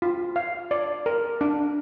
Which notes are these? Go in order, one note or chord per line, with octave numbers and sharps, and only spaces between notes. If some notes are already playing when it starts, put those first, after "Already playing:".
F4
F5
D5
A#4
D4